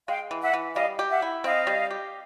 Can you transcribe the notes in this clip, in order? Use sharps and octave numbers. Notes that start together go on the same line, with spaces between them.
G#3 F5 G5
E3
E5 F#5
E3
G3 D#5 F5
G4
E5 F#5
E4
C4 D#5 F5
G3
G4